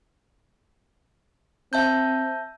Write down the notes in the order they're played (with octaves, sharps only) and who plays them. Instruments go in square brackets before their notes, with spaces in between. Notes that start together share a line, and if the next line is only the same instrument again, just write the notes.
[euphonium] C4 [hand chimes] E5 A5 G6